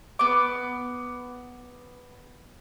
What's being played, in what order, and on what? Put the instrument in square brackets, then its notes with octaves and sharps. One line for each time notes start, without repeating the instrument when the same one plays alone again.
[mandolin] B3 D6